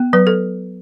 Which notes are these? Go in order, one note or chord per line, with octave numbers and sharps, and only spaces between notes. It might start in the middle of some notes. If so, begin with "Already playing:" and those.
Already playing: B3
F#3 B4
A4